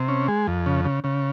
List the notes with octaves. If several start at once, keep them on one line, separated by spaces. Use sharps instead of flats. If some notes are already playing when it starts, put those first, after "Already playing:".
Already playing: C3
C#4
G#3
F2
C#3
C#3
C#3